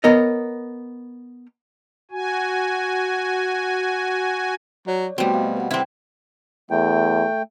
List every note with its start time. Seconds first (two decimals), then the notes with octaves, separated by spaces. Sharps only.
0.04 B3 A#4 C#5 D#5
2.11 F#4 G#5
4.87 F#3 C#5 D5
5.18 B2 G3 A3 C4 F#4
5.34 D#5 F5
5.57 B4 F#5
5.71 C3 C4 E4
6.71 E2 A3 G5